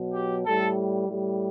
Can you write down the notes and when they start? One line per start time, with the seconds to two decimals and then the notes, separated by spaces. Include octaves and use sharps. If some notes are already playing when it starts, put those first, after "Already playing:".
Already playing: B2 F#3
0.13 G4
0.45 A2 G3 A4
1.08 A2 G3